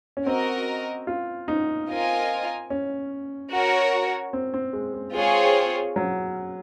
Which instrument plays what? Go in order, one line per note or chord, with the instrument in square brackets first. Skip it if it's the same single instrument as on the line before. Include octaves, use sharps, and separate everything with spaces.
[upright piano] C#4
[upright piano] C4 [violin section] F#4 A#4 D#5
[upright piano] F4
D#4
[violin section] C4 F4 A#4 D#5 G#5
[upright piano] C#4
[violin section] F#4 A#4 C#5
[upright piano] C4
C4
G#3
G#3
[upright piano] G#3 [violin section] C4 F4 G#4 C#5
[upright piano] F#3